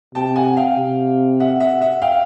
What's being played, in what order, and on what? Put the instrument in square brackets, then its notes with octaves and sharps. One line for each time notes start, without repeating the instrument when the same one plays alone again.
[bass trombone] C3 [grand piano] G5 A5
[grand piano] F#5 G#5
F5 G5
[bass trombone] C3
[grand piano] E5 F#5
E5 F#5
E5 F#5
F5 G5